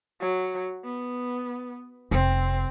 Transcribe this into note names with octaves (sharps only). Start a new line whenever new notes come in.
F#3
B3
F1 C4